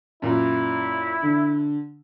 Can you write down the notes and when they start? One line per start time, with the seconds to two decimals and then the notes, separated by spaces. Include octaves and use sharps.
0.22 F#2 A#2 E4
1.23 D3